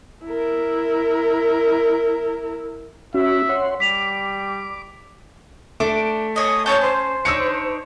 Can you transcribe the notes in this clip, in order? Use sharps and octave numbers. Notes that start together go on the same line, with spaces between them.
E4 A#4
C#4 F#4 E5
C#5 F#5 C6
G3 D6 B6 F7
A3 D4 D6
C#5 D#5 D#6
C#4 C#5 A5 G6
C5
D4 D#4 C#5 E6 C#7